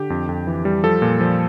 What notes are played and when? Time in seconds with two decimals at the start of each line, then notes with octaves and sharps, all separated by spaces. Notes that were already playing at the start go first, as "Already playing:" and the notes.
Already playing: D3 G4
0.10 F2
0.29 F2
0.47 E3
0.65 G3
0.84 F3 A4
1.02 A#2
1.21 F3